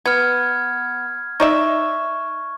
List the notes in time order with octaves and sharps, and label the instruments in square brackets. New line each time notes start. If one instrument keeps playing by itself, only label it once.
[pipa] B3 [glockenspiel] F6 G#6
[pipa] D#4 D5 E5 [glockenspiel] C#6